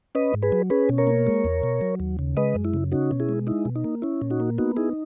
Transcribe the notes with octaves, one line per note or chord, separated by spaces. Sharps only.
C#4 B4 D#5
G#2
G#4 B4
F#3
C#4 G#4 B4
B2
A#4 C#5
A#3
G#3
E2
B2
F#3
D#2
C#3
G#3 B4 D#5
F#2
E4
C#3
C#4 D#4 F#4
B2
E4 G#4
G#3
D#4 E4
B2
D#4
A#3
C#4 E4
A#2
D#4 F#4
A#3
B3 D#4 F#4
D#4 E4 G#4